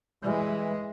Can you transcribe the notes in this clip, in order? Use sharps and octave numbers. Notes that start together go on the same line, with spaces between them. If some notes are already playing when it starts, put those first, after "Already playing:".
E3 G#3